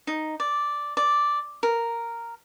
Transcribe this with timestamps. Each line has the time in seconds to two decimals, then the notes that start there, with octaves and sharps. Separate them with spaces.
0.07 D#4
0.40 D5
0.97 D5
1.63 A#4